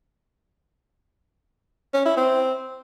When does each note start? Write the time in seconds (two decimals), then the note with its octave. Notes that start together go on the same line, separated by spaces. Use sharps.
1.94 C#4
2.05 E4
2.17 C4